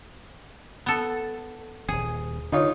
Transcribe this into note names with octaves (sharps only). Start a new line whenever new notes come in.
B3 A4
D#1 G#1 G#4
D3 D#4 F4 C#5